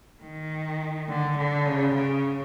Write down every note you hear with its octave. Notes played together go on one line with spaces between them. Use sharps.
D#3
D3
D3
C#3
C#3